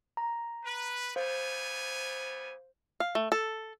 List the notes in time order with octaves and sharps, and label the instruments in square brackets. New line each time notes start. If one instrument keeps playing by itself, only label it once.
[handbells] A#5
[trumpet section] B4
[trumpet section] G3 B3 G#5 [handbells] C5 F5
[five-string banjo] F5
A3
A4